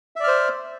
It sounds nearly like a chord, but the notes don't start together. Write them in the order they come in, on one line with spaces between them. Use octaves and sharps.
E5 D5 F6 C5